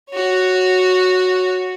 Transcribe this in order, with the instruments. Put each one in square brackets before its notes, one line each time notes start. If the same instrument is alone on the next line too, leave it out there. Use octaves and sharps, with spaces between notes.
[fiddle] F#4 C#5